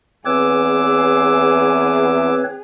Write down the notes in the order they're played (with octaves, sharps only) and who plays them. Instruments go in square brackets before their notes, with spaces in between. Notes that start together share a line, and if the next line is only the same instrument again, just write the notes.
[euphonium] E2 [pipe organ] C4 B4 C#5 [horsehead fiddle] G#4 [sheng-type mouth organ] D6 E6